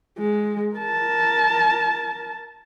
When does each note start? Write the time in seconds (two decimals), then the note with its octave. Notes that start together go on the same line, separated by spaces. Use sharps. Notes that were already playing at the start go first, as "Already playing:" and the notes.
0.19 G#3
0.76 A#4 A5